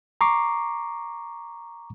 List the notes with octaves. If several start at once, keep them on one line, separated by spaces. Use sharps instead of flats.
A#5 C#6 D6 C7